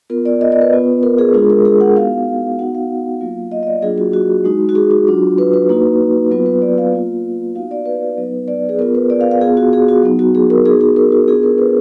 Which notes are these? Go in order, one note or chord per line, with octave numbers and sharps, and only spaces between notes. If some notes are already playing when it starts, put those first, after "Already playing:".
B3 F4 A#4
D5
D#5
D5
B4
B3 F4
A#4
G#4
G#3 D4 F4 G#4
A#4
G#4
F#5
B3 D#4 F#4 F5
B3 D#4 F#4 F#5
F5
F#3 A#3 F4
D#5
D#5
D5
F#3 A#3 D4 F4 G#4
F#4
F#4
G#3 D#4 F#4
F#4
G#4
F#4
F#3 D4 F4
B4
B4
A#3 D#4 F#4
F#3 B3 F4 B4
B4
D5
F5
A#3 F4
B3 D#4 F#4 F5
D5
B4
F#3 B3 D#4
D5
G#4
B3 F4 A#4
B4
D5
F5
F5
B3 F4 G#4
F#4
G#4
F#4
F#3 B3 D#4
F#4
G#4
A#4
B3 D#4 F#4 G#4
G#4
A#4
F#4
B3 D4 F4 G#4
A#4
B4